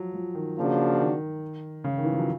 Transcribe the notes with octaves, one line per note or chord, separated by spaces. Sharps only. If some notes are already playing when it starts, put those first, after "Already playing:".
Already playing: F3 F#3
F3
D#3
C#3 F3 A#3 D4 F#4
D#3
C#3
D#3
E3
F3
F#3